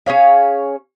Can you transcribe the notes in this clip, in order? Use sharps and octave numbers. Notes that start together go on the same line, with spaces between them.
C#4 G#4 C#5 F5